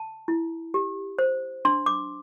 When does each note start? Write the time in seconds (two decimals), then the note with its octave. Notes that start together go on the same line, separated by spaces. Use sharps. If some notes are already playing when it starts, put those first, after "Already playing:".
Already playing: A5
0.28 E4
0.74 G4
1.19 C5
1.65 D4 C6
1.86 D6